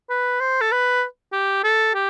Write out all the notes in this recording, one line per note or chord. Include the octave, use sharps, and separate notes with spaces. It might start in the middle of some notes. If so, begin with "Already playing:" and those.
B4
C5
A4
B4
G4
A4
G4